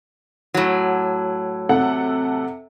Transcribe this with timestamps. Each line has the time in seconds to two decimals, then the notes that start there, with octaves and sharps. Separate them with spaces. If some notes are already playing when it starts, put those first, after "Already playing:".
0.54 A2 F#3
1.69 C3 A4 F#5